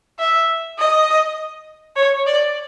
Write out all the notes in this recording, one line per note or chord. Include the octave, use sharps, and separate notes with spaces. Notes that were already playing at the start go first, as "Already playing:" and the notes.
E5
D#5
C#5
D5